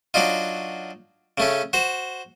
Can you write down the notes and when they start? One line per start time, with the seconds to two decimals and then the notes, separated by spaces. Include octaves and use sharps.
0.14 F#3 D4 D#4 F4
1.38 C#3 A3 C#4
1.73 F#4 C5